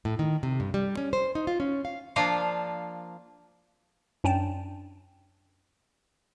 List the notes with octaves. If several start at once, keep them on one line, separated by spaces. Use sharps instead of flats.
A2
D#3
C3
G2
G3
C#4
C5
D#4
F4
C#4
F5
F3 A#3 D4 F4 C5 F5
F#2 C#4 D4 G5 A5